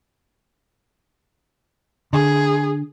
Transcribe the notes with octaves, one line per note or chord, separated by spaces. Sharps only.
D3 G#4